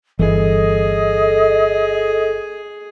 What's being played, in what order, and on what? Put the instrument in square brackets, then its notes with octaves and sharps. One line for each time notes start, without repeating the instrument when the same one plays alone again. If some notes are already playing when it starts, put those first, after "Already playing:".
[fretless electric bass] G1 E3 [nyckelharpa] G#4 [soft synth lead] A4 [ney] D#5